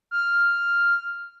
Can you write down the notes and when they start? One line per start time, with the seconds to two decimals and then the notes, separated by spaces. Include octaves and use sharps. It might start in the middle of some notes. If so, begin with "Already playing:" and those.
0.11 F6